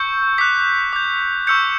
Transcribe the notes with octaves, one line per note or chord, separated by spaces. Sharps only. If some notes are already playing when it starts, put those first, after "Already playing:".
Already playing: C#6 E6 G6 C#7
D6 F#6 B6
D6 G6
C#6 E6 G6 C#7